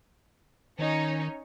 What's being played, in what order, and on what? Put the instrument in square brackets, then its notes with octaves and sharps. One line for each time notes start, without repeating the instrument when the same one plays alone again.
[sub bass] D#3 [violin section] C#4 D#4 C#5